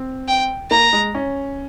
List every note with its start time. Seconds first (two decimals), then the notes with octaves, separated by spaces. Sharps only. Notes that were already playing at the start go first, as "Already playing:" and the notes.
Already playing: C4
0.28 G5
0.71 A#3 A#5
0.93 G#3
1.15 C#4